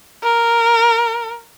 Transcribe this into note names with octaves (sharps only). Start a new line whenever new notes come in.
A#4